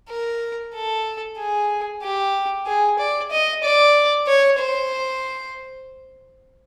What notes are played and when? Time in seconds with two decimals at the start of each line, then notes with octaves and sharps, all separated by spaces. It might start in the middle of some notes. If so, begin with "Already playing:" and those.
0.09 A#4
0.75 A4
1.38 G#4
2.03 G4
2.67 G#4
2.99 D5
3.31 D#5
3.63 D5
4.27 C#5
4.59 C5